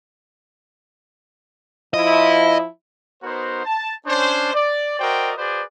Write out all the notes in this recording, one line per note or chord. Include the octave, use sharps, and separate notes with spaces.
F3 E4 D#5
B3 D#4 F#4 A#4 C5
A5
C#4 D4 C5
D5
F#4 A#4 C5 D5 D#5 G5
F#4 G#4 B4 C5 D5